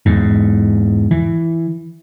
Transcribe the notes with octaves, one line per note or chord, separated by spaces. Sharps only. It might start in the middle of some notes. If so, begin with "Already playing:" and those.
E2 G#2
E3